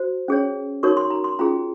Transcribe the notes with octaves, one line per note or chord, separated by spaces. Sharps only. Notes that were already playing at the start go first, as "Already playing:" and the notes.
Already playing: F#4 C5
C#4 G#4 C#5
D#4 F#4 A#4 C#5 C#6
C6
A#5
C6
C#4 F4 G#4 A#5